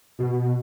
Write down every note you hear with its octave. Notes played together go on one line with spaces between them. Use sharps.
B2